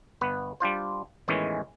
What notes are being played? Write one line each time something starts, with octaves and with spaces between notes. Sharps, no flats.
G1 B3 B4
G3 D4 F4 C5
E2 A2 D#3 E3 G#3 C#4